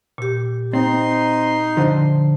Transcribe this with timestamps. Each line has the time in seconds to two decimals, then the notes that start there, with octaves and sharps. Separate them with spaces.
0.18 A#2 G4
0.73 C4 D#4 C6
1.77 D3 F3